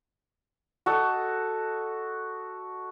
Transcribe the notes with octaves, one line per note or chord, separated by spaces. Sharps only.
F#4 A4 D#5